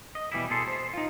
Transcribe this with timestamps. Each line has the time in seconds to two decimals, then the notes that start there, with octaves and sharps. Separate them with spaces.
0.15 D#5
0.32 B2 E3 G3 E4
0.50 B2 G#4 A4 C6
0.68 C5
0.94 D#4 F4